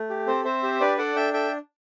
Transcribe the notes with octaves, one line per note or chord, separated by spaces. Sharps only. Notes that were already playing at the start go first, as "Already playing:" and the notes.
Already playing: A3
G4
C4 A4 C5
C4 C5 E5
G4
D4 B4 D5
A4 D5 F#5
D4 E5 G5
A4 E5 G5